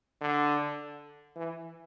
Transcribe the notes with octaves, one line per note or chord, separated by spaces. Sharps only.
D3
E3